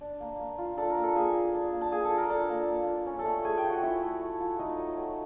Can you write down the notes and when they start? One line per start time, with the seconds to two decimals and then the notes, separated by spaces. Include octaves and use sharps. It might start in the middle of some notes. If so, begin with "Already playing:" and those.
0.01 D4
0.20 A#3
0.39 A#3
0.58 F4
0.77 D4 A4 A5
0.90 A#4 A#5
0.96 A#3
1.03 A4 A5
1.16 A#3 G#4 G#5
1.35 F4
1.54 D4
1.73 A#3
1.81 A5
1.92 A#3 G#4 G#5
2.05 A4 A5
2.11 F4
2.17 A#4 A#5
2.30 D4 A4 A5
2.50 A#3
2.68 A#3
2.87 F4
3.06 C#4
3.19 A4 A5
3.26 A3
3.44 A3 G#4 G#5
3.57 G4 G5
3.64 F4
3.70 F#4 F#5
3.83 C#4 E4 E5
4.02 A3
4.21 A3
4.40 F4
4.59 A3 D#4 D#5
4.79 F#3
4.97 F#3